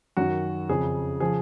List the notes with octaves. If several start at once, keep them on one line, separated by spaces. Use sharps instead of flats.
F#2 D#3 F#4
F2 C#3 F3 G#4
C#3 F3 G#4